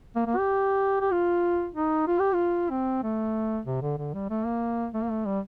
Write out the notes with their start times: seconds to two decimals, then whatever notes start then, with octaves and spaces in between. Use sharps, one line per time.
0.16 A#3
0.26 A#3
0.37 G4
1.01 G4
1.11 F4
1.75 D#4
2.07 F4
2.19 G4
2.33 F4
2.70 C4
3.03 A3
3.66 C3
3.82 D3
3.98 D3
4.14 G3
4.30 A3
4.45 A#3
4.94 A3
5.02 A#3
5.10 A3
5.26 G3